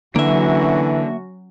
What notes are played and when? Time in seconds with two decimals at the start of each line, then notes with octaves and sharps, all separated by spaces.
0.16 D3 E3 F#3 A#3 C#4 F#4 E5